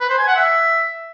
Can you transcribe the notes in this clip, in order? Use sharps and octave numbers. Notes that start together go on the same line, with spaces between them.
B4
C5
G#5
F#5
E5